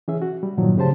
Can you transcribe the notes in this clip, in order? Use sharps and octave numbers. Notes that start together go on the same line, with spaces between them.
E3 C#4 G#4 E5
F#4
G3
G2 A#2 D#3 F3 F#3
A2 C#3 G4 C5 A5